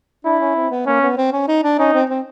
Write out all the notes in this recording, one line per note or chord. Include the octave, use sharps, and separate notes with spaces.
D4 E4
C#4
C4
B3
A#3 C#4
B3
C4
C#4
D#4
D4
C#4 D#4
C4
C4